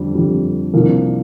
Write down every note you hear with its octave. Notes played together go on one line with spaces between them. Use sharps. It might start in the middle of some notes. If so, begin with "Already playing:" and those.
Already playing: F2 D3 G3
F2 D3 G3
C2 C3 F3 A#3 D4